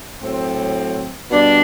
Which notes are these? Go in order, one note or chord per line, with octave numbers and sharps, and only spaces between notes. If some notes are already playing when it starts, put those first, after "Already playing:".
A2 F#3 C4
B2 G3 D4